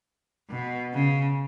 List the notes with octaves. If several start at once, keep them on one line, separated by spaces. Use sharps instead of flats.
B2
C#3